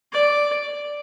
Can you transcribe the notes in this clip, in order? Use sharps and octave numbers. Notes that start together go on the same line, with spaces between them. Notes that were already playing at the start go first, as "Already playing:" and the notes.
D5